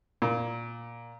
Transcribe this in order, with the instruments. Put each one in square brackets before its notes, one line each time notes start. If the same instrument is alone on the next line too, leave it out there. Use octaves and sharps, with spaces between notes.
[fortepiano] A#2